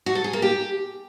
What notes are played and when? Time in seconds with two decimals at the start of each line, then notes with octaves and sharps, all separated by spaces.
0.06 F#4
0.15 A4
0.24 G#4
0.33 A#3
0.42 G4